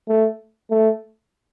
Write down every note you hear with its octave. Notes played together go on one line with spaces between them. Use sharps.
A3
A3